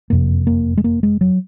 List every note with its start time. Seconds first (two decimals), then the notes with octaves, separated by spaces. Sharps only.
0.10 F#1 F2 C3 A#3
0.47 A#3
0.77 G#3
0.84 A#3
1.03 G#3
1.21 F#3